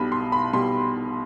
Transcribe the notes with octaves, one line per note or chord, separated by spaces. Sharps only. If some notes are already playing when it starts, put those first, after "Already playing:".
Already playing: B1 B2 G3 B5
C6
B5
B2 G3 C6